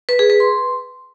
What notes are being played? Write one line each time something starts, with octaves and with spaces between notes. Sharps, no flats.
B4
G#4
B4
C6